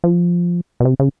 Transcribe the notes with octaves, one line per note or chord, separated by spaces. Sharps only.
F3
B2
C3
C#3